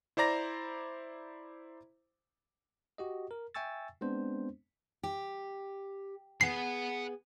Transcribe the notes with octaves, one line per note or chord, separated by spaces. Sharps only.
E4 C5 D5 A#5 A#6
F#4 G4 D#5
A#4
E5 G5 G#5 C#6 E6 A6
G#3 B3 C4 D4 C5
G4
B3 G#4 F#5 B5 C7